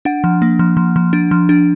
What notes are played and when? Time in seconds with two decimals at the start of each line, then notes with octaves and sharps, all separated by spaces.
0.05 D4 F#5
0.24 F3
0.42 A#3
0.59 F3
0.77 F3
0.96 F3
1.13 D4
1.31 F3
1.49 D4